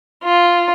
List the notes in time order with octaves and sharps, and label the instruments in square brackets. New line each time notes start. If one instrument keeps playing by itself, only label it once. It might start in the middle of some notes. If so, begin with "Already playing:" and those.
[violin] F4